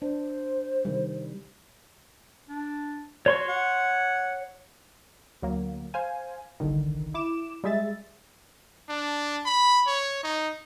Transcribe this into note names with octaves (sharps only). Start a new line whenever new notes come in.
D4 C5
C3 D#3 G3
D4
F#4 C#5 C6 C#6
F#5
D2 F#3 A#3
C5 F5 G#5
G1 C2 D3 D#3
E4 D6 E7
G3 G#3 G#4 E5 A6
D4
B5
C#5
D#4